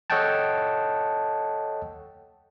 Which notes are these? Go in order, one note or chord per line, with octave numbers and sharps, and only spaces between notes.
A4 C#5 D#5 F#5 G5 A5